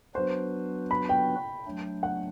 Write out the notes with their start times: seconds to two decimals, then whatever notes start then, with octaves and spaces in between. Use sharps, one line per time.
0.15 F#3 B3 D4 F#4 B4 C5
0.91 B5
1.09 G5
1.66 F#3 A3 D4
2.03 F#5